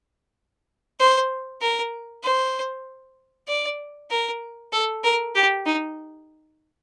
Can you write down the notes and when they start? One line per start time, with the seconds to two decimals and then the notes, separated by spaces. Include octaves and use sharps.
1.00 C5
1.61 A#4
2.23 C5
3.48 D5
4.11 A#4
4.72 A4
5.04 A#4
5.35 G4
5.66 D#4